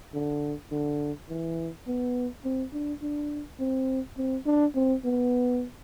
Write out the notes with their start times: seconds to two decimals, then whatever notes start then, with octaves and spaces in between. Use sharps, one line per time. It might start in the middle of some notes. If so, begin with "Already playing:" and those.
0.14 D3
0.71 D3
1.29 E3
1.87 B3
2.45 C4
2.73 D4
3.02 D4
3.60 C4
4.17 C4
4.46 D4
4.75 C4
5.04 B3